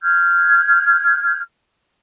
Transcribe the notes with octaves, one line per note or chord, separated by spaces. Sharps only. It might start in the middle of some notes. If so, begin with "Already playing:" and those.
F6 G6 G#6